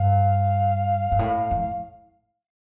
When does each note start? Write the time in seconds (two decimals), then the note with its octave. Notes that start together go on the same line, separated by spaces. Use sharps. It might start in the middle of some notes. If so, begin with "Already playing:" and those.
Already playing: G2 F5
1.12 G2
1.19 A2
1.51 F2